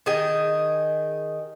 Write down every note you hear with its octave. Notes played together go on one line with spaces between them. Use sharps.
D#3 G#4 D#5 G5